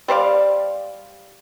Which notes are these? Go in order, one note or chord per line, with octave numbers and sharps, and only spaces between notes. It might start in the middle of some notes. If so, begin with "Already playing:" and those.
G3 C5 D5 F5